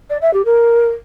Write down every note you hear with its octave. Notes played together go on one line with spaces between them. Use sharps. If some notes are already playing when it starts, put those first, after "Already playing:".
D5
E5
G4
A#4